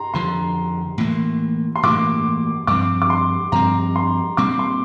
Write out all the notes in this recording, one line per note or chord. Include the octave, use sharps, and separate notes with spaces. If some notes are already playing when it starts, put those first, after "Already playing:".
Already playing: A#5 C6
F2 D3 F3 C6
A2 E3 A#3
C6
A2 E3 A#3 D6
G2 F3 C4 D6
D6
C6
G2 F3 C4 A#5
C6
A#2 G3 C4 D6
C6